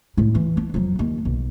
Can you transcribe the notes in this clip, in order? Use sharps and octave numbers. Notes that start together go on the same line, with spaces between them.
A2 E4
E3
D4
F2 F#3
D#2
B1